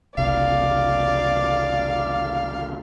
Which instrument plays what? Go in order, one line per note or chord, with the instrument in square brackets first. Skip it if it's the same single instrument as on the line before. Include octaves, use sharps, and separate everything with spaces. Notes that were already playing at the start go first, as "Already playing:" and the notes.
[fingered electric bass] F#1 C2 C3 [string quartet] D5 [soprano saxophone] F5